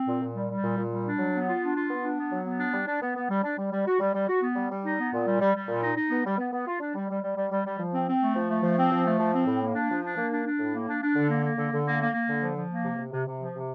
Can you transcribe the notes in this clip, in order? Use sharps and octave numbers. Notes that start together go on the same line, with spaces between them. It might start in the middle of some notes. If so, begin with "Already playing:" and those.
Already playing: C4
A#2
A#2
G3
G3
A#2
A#2
G3
D4
F#3
B3
F4
D4
F4
B3
D4
B3
F#3
B3
D4
G3
D4
B3
B3
G3
D4
G3
G3
F#4
G3
G3
F#4
B3
G3
G3
D#4
B3
A#2
G3
G3
G3
A#2
D#4
D#4
B3
G3
B3
B3
F4
D4
G3
G3
G3
G3
G3
G3
F3
C4
C4
A3
F3
A3
F3
C4
F3
A3
F3
C4
A2
A#3
D4
F3
D4
A#3
D4
D4
A2
A#3
D4
D4
D3
A#3
A#3
D3
D3
A#3
A#3
A#3
D3
F3
F3
A#3
C3
C3
C3
C3
F3
C3